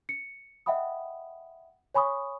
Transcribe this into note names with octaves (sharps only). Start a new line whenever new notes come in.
C#7
D#5 E5 F#5 G5 B5 D#6
C#5 G#5 B5 C#6 D#6